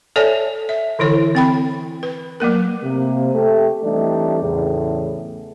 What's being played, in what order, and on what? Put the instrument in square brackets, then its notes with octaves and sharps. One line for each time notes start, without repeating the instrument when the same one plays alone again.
[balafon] A4 C#5 D5 E5 G#5 A5
E5
D3 E3 E4 A4 C#5
C4 G5 B5
B4
F#3 A3 A#3 A#4
[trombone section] C3 A#3
A3 G4
E3 G3 A3 C4 D4 D#4
E2 A2 C#3